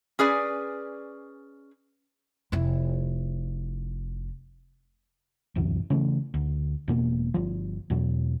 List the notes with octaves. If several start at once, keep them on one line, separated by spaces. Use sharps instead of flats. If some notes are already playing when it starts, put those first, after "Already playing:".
C#4 G#4 B4 D5
F1 E4
D1 C2 F#2 E3
C#3 E3 A3
D2
E1 B2 A#3
G1 F3
E2 B2 F#3